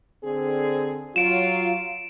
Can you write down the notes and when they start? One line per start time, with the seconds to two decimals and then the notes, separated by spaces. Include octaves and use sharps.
0.24 D3 C4 G#4
1.16 F#3 F4 D7 E7